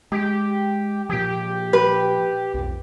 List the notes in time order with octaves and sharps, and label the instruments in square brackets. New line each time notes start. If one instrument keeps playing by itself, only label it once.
[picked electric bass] G#3 [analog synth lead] G4
[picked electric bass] A#2 F3 [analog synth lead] G4
[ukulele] B4
[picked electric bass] B1 F2